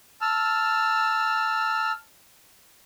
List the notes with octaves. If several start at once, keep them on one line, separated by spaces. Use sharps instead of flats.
A5 E6 F6